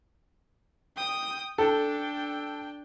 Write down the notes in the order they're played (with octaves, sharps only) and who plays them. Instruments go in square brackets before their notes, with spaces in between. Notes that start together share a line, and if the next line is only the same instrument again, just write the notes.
[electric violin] G5 D#6
[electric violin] D4 G5 [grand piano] A4